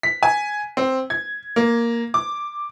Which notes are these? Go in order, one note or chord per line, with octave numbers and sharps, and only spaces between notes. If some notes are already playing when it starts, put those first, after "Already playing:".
B6
G#5
C4
G#6
A#3
D6